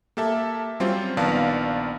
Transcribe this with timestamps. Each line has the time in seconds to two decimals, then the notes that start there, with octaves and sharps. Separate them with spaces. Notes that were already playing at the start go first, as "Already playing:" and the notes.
0.17 A#3 G4 A4 E5 A5
0.80 F#3 G3 C4 C#4 F4 C5
1.17 A#1 D#3 B3 D5 F5 A5